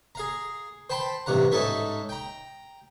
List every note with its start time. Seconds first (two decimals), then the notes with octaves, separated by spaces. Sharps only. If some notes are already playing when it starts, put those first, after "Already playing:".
0.15 G#4 F5 A#5
0.90 C5 G5 A5 B5 C6
1.26 A1 G2 C3 F#5 A#5
1.52 G#2 G#3 C#4 D#4 A4 E5
2.09 G5 A#5